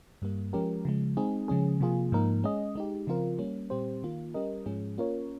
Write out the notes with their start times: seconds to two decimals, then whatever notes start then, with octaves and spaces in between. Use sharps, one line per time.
0.22 G2 G3 A#3
0.53 F3 G#3 C#4 G4 A#4
0.85 C#3 F3 G#3
1.17 G#3 C4 D#4 G#4
1.48 C#3 F3 G#3 C#4 G#4
1.80 C3 F3 A#3 F4 G#4
2.12 G#2 F3 A#3 D#4 A#4
2.43 G#3 C#4 G#4 D#5
2.75 G#3 D#4 G4
3.07 C#3 F3 C4 F4 A#4
3.39 G3 A#3 C#4
3.70 A#2 G3 C4 G4 C5
4.03 D#3 A#3 F4
4.34 G3 C#4 G4 A#4 D#5
4.66 G#2 F3 G#3 C#4 G#4
4.98 A#3 C#4 F4 A#4 C#5